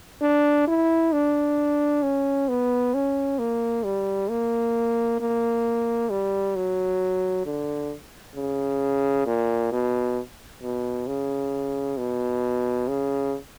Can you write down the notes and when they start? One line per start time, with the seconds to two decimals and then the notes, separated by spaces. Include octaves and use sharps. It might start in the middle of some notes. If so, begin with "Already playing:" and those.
0.22 D4
0.67 E4
1.13 D4
2.03 C#4
2.48 B3
2.94 C#4
3.39 A#3
3.84 G3
4.30 A#3
5.20 A#3
6.10 G3
6.56 F#3
7.46 D3
8.36 C#3
9.26 A#2
9.72 B2
10.62 B2
11.07 C#3
11.97 B2
12.88 C#3